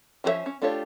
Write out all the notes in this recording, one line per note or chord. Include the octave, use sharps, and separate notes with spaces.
F3 C#4 G#4 C#5 E5
C#4
A3 D4 F4 G4 C#5